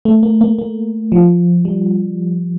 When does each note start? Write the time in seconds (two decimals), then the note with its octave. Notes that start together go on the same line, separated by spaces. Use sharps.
0.05 A3
0.23 A#3
0.41 A#3
0.59 A#3
1.12 F3
1.65 G3